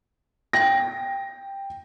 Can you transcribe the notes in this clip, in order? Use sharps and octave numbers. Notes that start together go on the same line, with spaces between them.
G5 A#6